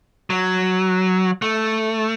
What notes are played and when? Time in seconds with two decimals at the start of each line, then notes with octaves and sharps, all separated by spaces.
0.30 F#3
1.42 A3